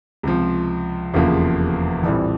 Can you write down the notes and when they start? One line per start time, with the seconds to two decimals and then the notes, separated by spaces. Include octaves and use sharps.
0.23 C#2 C3 F3
1.14 F1 E2 C#3 F3 A#3
2.03 A#1 A2 E3 G3 C4